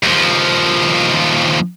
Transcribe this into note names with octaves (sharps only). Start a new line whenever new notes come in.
D#2 F3